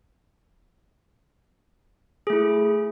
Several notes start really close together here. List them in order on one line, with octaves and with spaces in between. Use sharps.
G#4 A3 E4